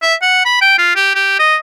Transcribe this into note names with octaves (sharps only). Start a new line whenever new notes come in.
E5
F#5
B5
G5
F4
G4
G4
D#5